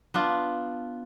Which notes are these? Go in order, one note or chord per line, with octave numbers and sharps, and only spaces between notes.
B3 D4 F4